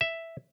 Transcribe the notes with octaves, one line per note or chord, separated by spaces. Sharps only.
E5